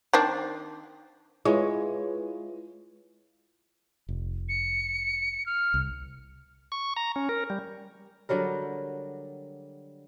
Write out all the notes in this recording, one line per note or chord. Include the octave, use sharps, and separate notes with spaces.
D#3 C4 D4
G#3 E4 F4 B4 C#5
F1
C#7
F6
C2
C#6
A#5
C#4
A#4
G3
D3 F#3 G3 A#4